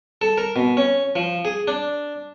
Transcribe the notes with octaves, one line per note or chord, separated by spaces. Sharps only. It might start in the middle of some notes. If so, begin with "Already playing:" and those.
A4
A#4
B2
C#4
F3
G#4
D4